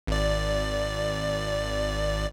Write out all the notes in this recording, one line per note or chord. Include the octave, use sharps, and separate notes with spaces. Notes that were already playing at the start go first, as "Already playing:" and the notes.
G#1 D5